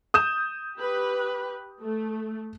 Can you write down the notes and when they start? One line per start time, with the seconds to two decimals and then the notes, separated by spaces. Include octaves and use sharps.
0.14 D#6 G6 E7
0.77 G4 B4
1.81 A3